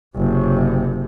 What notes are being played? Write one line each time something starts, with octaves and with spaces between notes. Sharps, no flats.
F#1 C3